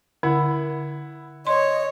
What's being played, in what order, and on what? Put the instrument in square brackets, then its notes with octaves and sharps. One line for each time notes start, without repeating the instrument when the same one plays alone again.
[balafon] D3 [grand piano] E4 F#5
[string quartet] C#5 [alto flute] D#5 [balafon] C6